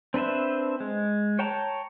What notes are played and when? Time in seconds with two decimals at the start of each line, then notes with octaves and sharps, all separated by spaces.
0.14 C4 D4 B4 C5 E5
0.80 G#3
1.39 C#5 G5 A5 A#5